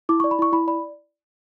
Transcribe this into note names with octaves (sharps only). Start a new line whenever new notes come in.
E4 D6
D5 C#6
B5
E4 C#6
E4 B5
D5 B5